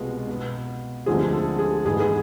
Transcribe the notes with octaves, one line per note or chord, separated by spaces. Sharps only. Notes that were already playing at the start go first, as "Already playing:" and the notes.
Already playing: C2 B2 G#3 B3 F4
B2 B3
D2 D3 F3 G#3 C4 G#4
A4
G#4
G#2 E3 G#3 B3 G#4
G#4